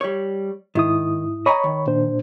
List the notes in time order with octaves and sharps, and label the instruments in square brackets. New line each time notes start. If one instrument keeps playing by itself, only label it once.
[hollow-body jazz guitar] G3 C#5
[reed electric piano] G#2 E4 D#6 [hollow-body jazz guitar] D#3
[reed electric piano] C#5 B5 C#6 [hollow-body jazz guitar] D#5 G#5 A#5
[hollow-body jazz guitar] D#3
[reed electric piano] A#2 D4 C5